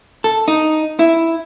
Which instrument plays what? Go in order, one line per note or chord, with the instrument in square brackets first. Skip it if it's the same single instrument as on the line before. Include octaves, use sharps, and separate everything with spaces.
[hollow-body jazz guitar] A4
D#4
E4